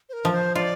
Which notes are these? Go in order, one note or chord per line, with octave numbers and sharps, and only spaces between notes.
C5
A#4
F3
C5
F4 D5